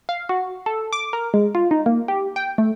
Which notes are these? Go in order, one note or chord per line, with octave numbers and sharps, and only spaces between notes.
F5
F#4
A4
D6
A#4
G#3
F4
D#4
A#3
G4
G5
A3